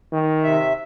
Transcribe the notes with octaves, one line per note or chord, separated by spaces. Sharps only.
D#3
C3 E5